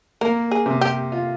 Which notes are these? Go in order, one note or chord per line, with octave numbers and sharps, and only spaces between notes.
A#3 A#4
G#4
C3
G4
F4